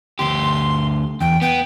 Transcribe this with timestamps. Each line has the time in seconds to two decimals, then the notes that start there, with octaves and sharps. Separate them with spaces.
0.19 D2 G4 C6
1.21 E2 G5
1.42 B3 G5